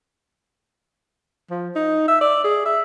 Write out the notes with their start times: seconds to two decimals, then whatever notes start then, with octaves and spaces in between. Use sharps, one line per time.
1.51 F3
1.76 D#4
2.08 E5
2.21 D5
2.44 G#4
2.66 E5